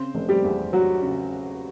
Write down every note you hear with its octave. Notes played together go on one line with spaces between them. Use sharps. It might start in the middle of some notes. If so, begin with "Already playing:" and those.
Already playing: C#3 C4 C5
F1
G3 G4
E2
F#3 F#4
C#3